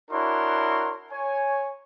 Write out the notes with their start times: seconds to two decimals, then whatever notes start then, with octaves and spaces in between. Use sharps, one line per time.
0.11 D4 E4 F#4 A#4 C#5 C6
1.12 C#5 G#5